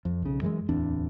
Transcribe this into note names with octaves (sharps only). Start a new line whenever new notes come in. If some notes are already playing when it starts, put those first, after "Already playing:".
F2
B1 C#3
F#2 E3 G3 G#3
D1 E2 C4 D4